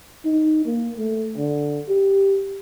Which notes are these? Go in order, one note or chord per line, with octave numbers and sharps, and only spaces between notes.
D#4
A#3
A3
D3
G4